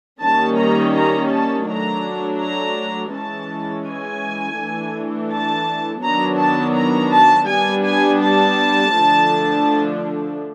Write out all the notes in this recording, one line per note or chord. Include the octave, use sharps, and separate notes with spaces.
D#3 G3 A#3 C#4 A5
A#5
A#5
A5
F#3 A3 D4 A#5
A#5
E3 G#3 C#4 A5
G#5
E3 A3 D4
A5
D#3 F#3 B3 D4 A#5
A5
A#5
A5
G3 B3 D4 G#5
G#5
A5
D3 F3 A3 D4